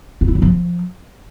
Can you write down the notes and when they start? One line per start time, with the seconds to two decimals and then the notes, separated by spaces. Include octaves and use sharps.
0.21 F4
0.28 E4
0.35 F#3
0.42 F3